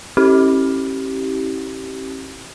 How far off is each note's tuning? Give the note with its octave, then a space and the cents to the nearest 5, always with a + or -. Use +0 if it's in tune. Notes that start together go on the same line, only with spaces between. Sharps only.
C#4 -45 E4 -30 G4 -20